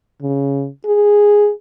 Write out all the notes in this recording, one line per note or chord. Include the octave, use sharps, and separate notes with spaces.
C#3
G#4